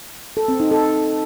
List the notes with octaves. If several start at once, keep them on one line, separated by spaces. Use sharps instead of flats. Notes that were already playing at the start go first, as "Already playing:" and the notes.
A4
C4
D#4
A4